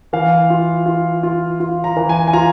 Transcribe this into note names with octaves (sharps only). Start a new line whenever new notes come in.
E3 F5
F4
F4
F4
F4
A#5
E3
G#5
G#5
F4 A#5